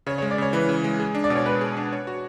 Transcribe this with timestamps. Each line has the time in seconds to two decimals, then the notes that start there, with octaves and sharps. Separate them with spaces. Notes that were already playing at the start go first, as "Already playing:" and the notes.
0.06 C#3 C#5
0.18 C#5
0.22 G#3
0.31 D5
0.38 C#3 C#5
0.53 E3 B4
0.69 C#3
0.84 G#3
0.99 G#4
1.15 D4
1.24 D5
1.30 B2
1.35 C#5
1.46 G#3 B4
1.61 G#4
1.77 D4
1.92 C#5
2.07 F#4